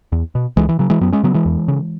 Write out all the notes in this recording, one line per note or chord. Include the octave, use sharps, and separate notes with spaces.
E2
B2
C#2 E3 G#3
E3
C#3 F#3
E3 G#3
F#2 F#3 B3
G#3 C#4
C#3 F#3 B3
E3 G#3
E2
C#3